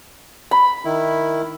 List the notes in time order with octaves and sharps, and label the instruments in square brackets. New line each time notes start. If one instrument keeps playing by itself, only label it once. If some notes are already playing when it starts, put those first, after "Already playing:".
[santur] B5
[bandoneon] D#3 E4